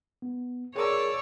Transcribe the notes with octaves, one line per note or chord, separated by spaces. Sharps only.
B3
G#4 A#4 C#5 D5 E6